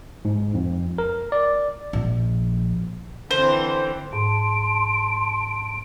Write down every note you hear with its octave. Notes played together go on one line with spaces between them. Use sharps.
G#2
F2
A#4
D5
A#1
D3 E3 C4 C5
G#2 A5 C6 D7